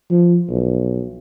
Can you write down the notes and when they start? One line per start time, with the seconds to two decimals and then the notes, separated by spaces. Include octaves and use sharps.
0.11 F3
0.50 B1